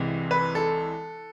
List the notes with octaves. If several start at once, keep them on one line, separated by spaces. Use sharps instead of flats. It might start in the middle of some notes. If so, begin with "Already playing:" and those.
Already playing: C2 C3 E3 G#3
B4
A4